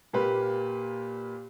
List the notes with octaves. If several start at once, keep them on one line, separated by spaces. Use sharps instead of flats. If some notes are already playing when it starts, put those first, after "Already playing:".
A#2 A#3 G4 B4